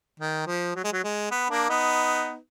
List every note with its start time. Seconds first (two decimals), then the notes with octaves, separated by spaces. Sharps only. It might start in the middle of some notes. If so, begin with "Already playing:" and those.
0.20 D#3
0.47 F3
0.75 F#3
0.84 G#3
0.93 F#3
1.04 G#3
1.31 B3
1.50 A#3 D4
1.69 B3 D#4